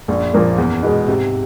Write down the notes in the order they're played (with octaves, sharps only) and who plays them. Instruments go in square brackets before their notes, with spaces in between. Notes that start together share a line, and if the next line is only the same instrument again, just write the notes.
[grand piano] A#1 [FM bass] F#2
[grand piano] A#2 F3 A#3
E2
B2 G#3
[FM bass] G#2 [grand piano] C3